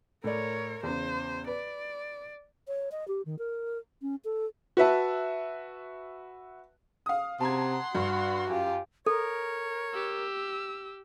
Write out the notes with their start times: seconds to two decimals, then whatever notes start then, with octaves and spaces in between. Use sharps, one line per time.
0.24 A2 A#4 C#5 D5
0.83 E2 C#3 C5
1.47 B4 D5
2.68 C#5
2.92 D#5
3.08 G4
3.26 D#3
3.39 A#4
4.02 C#4
4.24 A4
4.77 F#4 B4 E5 A5
7.06 F5 D#6
7.40 C3 F#5 A5 A#5 C6 G#6
7.95 G2 F#4
8.49 F#2 F4 G4
9.06 A4 A#4 C#5
9.94 G4 E6